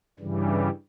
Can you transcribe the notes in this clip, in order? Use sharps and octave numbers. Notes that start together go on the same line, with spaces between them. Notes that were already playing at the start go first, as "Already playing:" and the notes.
G2 C#3 E3 G3